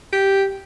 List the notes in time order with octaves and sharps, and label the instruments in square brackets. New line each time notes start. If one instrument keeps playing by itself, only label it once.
[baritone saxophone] G4